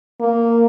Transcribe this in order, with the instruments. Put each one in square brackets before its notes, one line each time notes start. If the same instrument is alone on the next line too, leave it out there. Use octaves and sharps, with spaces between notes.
[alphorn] A#3